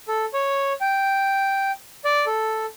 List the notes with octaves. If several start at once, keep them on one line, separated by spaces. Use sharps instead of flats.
A4
C#5
G5
D5
A4